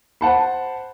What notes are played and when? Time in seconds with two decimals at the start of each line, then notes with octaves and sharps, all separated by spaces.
0.21 C5 F#5 A5 B5